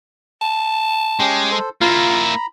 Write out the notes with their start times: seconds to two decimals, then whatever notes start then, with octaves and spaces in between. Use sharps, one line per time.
0.42 A5
1.20 G#3 C#4 G4 G5
1.51 A4 C5
1.81 A#3 E4 F4 A#5 B5